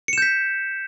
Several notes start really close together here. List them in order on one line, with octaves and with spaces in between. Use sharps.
C#7 E7 G6 B6